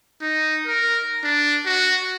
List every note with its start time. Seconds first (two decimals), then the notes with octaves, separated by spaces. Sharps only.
0.21 D#4
0.67 A#4
1.23 D4
1.65 F#4